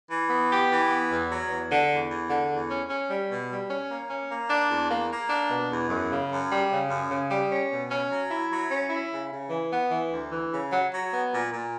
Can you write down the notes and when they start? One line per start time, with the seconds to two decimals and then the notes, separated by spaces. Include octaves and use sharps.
0.09 E3
0.29 B3
0.50 G4
0.69 E3
0.90 B3
1.10 E2
1.30 F#3
1.49 E2
1.69 D3
1.90 E2
2.10 E2
2.29 D3
2.50 E2
2.69 C#4
2.89 C#4
3.10 G3
3.30 B2
3.50 G3
3.70 C#4
3.89 A#3
4.09 C#4
4.30 A#3
4.50 D4
4.70 E2
4.90 A#3
5.10 A#3
5.30 D4
5.50 B2
5.71 E2
5.90 F#2
6.10 C#3
6.31 F#2
6.50 G3
6.71 C#3
6.90 F#2
7.10 C#3
7.30 G3
7.50 C#4
7.70 B2
7.90 C#4
8.10 F#3
8.30 E4
8.50 F#3
8.70 C#4
8.90 E4
9.10 C#3
9.31 C#3
9.50 E3
9.71 B3
9.91 E3
10.10 D2
10.31 E3
10.51 C#3
10.70 F#3
10.91 F#3
11.10 B3
11.31 A#2
11.50 A#2